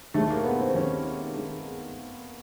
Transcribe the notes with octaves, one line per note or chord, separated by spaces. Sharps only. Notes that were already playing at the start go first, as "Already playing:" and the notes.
D#2 D#3 G#3 A3
A#3
B3
C4
D#2 D#3 G#3 C#4
D#3 G#3